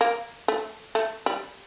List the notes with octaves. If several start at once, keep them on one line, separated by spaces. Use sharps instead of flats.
A#3
A3
A3
G3